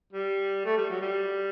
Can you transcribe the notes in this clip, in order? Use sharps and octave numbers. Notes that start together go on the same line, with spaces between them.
G3
A3
G3
F#3
G3